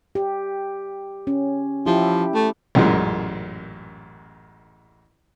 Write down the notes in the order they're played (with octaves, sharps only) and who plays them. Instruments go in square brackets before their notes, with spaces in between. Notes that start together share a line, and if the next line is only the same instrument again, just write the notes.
[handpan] G4
C#4
[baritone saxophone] F3 [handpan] E4 G4
[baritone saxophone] A3
[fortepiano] A1 F#2 A#2 G#3